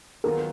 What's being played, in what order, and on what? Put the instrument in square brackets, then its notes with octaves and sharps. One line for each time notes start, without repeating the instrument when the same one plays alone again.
[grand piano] D#2 D#3 F#3 B3 F4 [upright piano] A#4